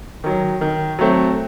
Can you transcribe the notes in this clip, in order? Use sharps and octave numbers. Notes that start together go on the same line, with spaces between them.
D#3 F#3
D#3
F#3 A3 C4